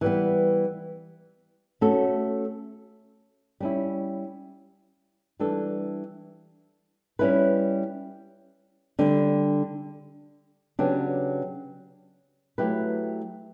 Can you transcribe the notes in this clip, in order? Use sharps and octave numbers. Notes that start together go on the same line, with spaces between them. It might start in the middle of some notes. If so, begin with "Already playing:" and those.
E3 G3 B3
A3 C#4 F#4 A4
G3 C#4 E4
E3 G3 D4 A4
G3 C#4 E4 B4
D3 G3 D4
C#3 F#3 B3 D4 G4
F#3 A3 E4 G4 B4